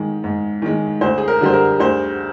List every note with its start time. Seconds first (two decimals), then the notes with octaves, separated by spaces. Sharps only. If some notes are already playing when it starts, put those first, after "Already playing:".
Already playing: G#2 D#3 G#3
0.24 G#2
0.62 D#3 G#3
1.01 D2 C5
1.18 G#4
1.28 A#4
1.41 D3 G3 C5
1.54 A#4
1.80 D2 C5